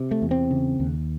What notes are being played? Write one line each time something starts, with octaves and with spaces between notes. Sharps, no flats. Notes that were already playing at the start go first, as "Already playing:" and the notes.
Already playing: C3
A3
E2
C4
C#3
D#2